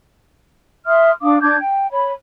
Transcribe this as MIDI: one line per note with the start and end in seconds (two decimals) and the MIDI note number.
0.87 1.11 76
0.87 1.11 84
0.87 1.11 87
0.87 1.11 89
1.22 1.39 62
1.22 1.39 77
1.22 1.39 86
1.22 1.39 87
1.41 1.57 62
1.41 1.57 86
1.41 1.57 91
1.41 1.57 92
1.60 1.90 79
1.91 2.12 73
1.91 2.12 83